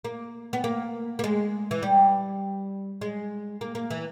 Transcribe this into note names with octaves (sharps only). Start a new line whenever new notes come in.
A#3
B3
A#3
A#3
G#3
E3
G3
G#3
A#3
A#3
E3